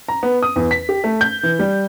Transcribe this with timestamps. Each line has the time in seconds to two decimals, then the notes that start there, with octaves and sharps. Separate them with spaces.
0.08 A#5
0.23 B3
0.42 D#6
0.56 E2
0.71 B6
0.89 G4
1.04 A3
1.21 G6
1.43 E3
1.59 G3